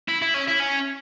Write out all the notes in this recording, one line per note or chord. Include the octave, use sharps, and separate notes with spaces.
E4
E4
C#4
E4
C#4